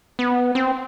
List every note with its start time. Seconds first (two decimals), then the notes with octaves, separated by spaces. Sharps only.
0.19 B3
0.55 C4